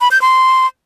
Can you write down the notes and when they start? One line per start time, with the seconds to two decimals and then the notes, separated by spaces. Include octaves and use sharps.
0.01 B5
0.11 G6
0.22 C6